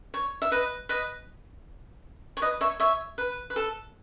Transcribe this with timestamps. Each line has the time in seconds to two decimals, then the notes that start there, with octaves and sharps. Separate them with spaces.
0.14 C#5
0.42 E5
0.52 B4 D#5
0.89 B4 D#5
2.37 C#5
2.42 B4 D#5
2.61 C#5 E5
2.80 C#5 E5
3.18 B4
3.50 B4
3.56 A4